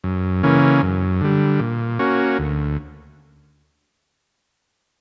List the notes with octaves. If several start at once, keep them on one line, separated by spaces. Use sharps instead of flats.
F#2
C#3 E3 A#3 C#4
F#2
D3 G3
A#2
A#3 C#4 F#4
D2